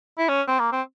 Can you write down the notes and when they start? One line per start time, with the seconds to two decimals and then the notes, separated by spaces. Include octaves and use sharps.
0.18 E4
0.29 C#4
0.48 C4
0.59 A#3
0.72 C4